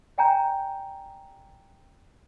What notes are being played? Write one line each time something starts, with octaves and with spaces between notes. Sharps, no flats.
D5 G5 G#5 A#5 G6